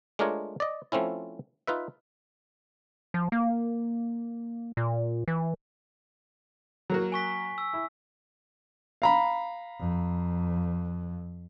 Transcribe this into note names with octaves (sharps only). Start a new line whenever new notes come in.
G#3 A3 D4 F4 A#4 C#5
D5 D#5
F3 A3 C4 C#4 E4
D#4 F4 B4 E5
F3
A#3
A#2
E3
F#3 A#3 F#4
G#5 C#6 B6
E6
E4
F5 A#5 B5
F2